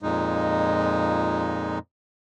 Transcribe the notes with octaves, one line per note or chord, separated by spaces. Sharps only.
F2 A#2 G#3 D#4